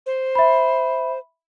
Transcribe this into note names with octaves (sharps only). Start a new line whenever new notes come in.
C5
E5 B5